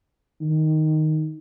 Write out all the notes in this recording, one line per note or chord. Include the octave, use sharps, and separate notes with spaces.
D#3